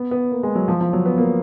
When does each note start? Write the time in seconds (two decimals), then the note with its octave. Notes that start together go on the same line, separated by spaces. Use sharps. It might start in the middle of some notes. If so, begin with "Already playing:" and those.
Already playing: B3
0.11 B3
0.32 A#3
0.43 G#3
0.55 F#3
0.68 F3
0.81 F3
0.93 F#3
1.05 B3
1.18 A#3